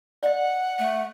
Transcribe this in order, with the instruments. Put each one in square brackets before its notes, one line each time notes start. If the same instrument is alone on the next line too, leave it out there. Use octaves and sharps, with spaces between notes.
[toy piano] D5 D#5 [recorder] F#5
[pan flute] A3